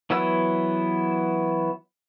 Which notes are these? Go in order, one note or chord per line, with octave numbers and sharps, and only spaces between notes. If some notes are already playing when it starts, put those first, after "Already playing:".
E3 F#3 B3 E4 E6